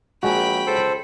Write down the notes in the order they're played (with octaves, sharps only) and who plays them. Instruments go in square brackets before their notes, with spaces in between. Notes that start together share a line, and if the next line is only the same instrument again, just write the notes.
[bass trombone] A#1 [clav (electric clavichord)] G#3 F#4 [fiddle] G5 B5
[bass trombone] C#2 [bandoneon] A4 C5